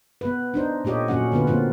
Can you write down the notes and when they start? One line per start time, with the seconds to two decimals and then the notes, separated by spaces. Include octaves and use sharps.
0.21 B3 B4
0.54 D4 D#4 C5
0.85 A#2 A3 F4 G4 C#5 D#5
1.08 A#2 F#3 C#4 F#5
1.32 D3 B3 F4 B4
1.47 F3 A#3 C4 F4